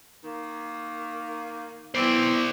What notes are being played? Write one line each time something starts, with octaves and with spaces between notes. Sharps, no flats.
D#3 A#3
E3 B3 C4 E4 C5 D5